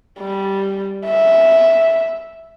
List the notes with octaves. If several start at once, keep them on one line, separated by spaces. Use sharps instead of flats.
G3
E5